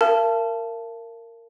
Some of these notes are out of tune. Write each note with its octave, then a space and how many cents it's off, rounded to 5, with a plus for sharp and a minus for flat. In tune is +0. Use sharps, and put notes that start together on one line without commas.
A#4 -15 F5 -45 A5 +0